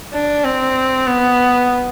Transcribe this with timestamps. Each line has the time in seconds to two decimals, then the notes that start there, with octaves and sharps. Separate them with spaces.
0.14 D4
0.45 C4
1.06 B3